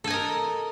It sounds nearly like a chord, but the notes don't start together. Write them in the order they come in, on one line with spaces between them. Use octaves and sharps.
A4 G#5 D#5 A#4